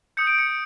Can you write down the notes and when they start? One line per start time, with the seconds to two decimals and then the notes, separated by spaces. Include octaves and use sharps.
0.17 D#6 G6 C#7
0.27 D7
0.38 C#7